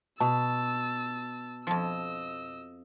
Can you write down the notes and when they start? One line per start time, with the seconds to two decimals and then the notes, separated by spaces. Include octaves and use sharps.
0.20 B2 A5 E6 A6
1.67 F2 F3 D#5 E6